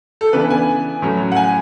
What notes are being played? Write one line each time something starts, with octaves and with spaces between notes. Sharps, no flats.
A4
C#3 E3 B3 D4 B4
G#5
A2 F#3 C#4
F#5
G#5